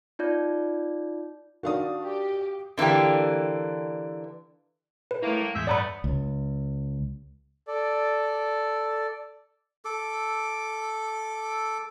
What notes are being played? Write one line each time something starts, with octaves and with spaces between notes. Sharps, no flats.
D#4 F4 D5 G6
D#3 D4 F#4 F5 D#6
G4
D3 E3 A#3 D4 G4
B4
A2 A3 A#3 E4
G#3
E2 A2 G#3 E5 G6
G2 A3 B3 D5 A#5 B5
C#2
A4 D5
A4 D6